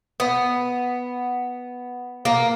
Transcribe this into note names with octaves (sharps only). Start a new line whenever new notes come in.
B3
A#3